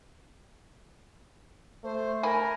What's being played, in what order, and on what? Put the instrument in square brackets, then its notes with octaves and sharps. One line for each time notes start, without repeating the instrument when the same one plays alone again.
[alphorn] A3 [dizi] C5
[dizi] A#4 [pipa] G#5 B5